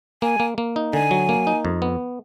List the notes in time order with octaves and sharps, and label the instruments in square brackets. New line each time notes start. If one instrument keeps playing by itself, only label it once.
[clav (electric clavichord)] A#3 [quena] G#5
[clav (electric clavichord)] A#3
A#3
D#4
[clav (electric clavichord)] D3 [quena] G#5
[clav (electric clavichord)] F#3
A#3
D#4
F2
B3